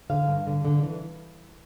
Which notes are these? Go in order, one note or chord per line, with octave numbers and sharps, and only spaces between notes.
D3 F5
G2
D3
D3
E3